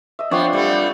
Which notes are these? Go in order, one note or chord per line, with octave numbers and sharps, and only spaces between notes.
D#5 E5
F3 B3 C4 D4 F4 C#5 D5
G3 A3 B3